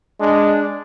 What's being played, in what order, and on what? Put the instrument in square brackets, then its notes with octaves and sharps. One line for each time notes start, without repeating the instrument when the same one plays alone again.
[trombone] G#3 [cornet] D4